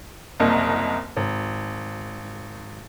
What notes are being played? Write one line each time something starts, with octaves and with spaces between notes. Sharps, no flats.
F#1 C2 A#3 D#5
G#1